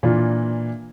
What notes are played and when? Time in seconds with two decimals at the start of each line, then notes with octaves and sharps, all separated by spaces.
0.03 A#2 E3 D4 F4